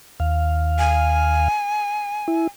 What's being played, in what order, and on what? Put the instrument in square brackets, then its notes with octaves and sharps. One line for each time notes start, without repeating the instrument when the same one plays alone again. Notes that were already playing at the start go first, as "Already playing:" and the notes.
[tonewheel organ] D#2 F5
[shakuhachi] G#5
[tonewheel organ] E4